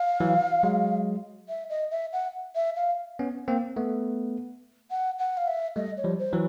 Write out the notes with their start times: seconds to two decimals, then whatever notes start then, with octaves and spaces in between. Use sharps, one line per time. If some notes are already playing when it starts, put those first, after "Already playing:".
Already playing: F5
0.20 E3 F#3
0.63 F#3 G#3
1.49 E5
1.70 D#5
1.91 E5
2.13 F#5
2.55 E5
2.76 F5
3.19 B3 C#4
3.48 A#3 C4
3.76 A3 B3
4.91 F#5
5.19 F#5
5.37 F5
5.48 E5
5.76 G3 A3 D#5
5.97 C#5
6.04 F3 G3
6.19 C5
6.33 E3 F#3